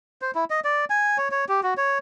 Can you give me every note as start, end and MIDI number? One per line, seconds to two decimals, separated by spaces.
0.22 0.31 72
0.35 0.45 64
0.50 0.60 75
0.64 0.85 74
0.90 1.18 80
1.18 1.28 73
1.31 1.45 73
1.49 1.61 67
1.63 1.74 66
1.77 1.98 73